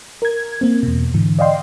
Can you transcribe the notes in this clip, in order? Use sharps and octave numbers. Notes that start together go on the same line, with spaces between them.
A#4 G#6
A#3 C4
E2 B2
G#2 D3 E3
D5 D#5 F5 G5 C6